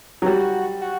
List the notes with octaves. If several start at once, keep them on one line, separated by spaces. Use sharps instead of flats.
F#3
G3 F#4
F#4